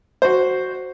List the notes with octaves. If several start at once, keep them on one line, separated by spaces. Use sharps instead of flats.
F#4 C5